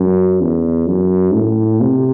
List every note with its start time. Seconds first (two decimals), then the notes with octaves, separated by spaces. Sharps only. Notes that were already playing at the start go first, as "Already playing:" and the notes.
Already playing: F#2
0.41 E2
0.88 F#2
1.34 A2
1.81 C3